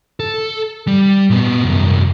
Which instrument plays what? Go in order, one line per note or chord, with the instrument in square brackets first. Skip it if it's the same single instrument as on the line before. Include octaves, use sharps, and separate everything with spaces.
[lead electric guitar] A4
G3
A#2 B3
C2 F#2